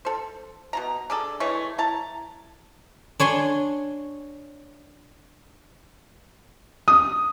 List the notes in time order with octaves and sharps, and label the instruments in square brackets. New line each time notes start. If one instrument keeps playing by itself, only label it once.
[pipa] A4 C5
B2 F4 A#5
D4 G#4 A4
E3 G#3 A3 C#5
E4 A5 A#5
[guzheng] D4 C#5 G#5 C6
[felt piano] D#6